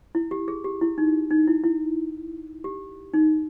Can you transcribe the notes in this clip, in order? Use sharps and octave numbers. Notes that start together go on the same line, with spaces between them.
E4
G4
G#4
G4
E4
D#4
D#4
E4
E4
G4
D#4